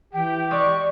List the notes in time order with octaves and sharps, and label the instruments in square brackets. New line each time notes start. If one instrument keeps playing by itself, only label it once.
[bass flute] E3 [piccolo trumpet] G4 [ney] G5
[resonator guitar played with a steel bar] G#3 D5 [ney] C#6